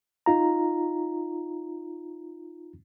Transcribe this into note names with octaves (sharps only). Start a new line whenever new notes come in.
D#4 F4 A#5